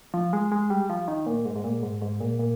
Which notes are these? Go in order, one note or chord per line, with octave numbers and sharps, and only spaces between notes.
F3
G#3
G#3
G3
F3
D#3
A#2
G#2
G#2
A#2
G#2
G#2
A#2
A#2